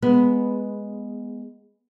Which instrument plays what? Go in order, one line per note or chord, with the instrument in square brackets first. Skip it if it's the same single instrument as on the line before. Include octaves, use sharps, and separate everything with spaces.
[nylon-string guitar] G#3 B3